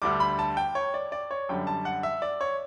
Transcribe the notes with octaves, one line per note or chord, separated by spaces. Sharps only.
D2 D3 G3 D6
B5
A5
G5
C#5
D5
D5
C#5
F#2 D3 G3 G5
A5
F#5
E5
D5
C#5